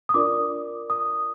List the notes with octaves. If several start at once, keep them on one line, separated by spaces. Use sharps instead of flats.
D#6
D4 F4 A#4 D5 D6
D#6